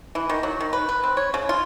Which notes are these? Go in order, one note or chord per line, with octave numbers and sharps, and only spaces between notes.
E3
D#3
F#3
D#3
B4
B4
C4
C#5
C#3
F4